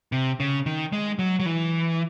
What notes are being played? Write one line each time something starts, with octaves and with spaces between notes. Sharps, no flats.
C3
C#3
D#3
G#3
F#3
F#3
E3